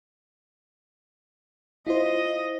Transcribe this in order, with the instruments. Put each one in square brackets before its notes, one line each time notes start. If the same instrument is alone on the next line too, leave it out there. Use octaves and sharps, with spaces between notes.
[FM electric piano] E4 F4 C5 [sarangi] D#5